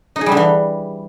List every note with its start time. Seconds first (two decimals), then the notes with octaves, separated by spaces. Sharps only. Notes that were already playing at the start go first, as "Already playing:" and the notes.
0.16 D#4
0.21 G#4
0.26 G3
0.32 D3
0.37 E3